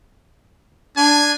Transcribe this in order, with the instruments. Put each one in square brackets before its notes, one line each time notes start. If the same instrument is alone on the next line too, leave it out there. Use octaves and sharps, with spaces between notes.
[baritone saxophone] D4 [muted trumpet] G#5